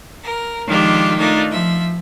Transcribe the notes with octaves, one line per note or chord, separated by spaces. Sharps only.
A#4
D#3 F3 G#3 D4 F4 G4
A3 D4 D#4 F4 A#4
F3 E5